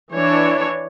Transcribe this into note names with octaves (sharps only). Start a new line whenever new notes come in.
E3 D4 C#5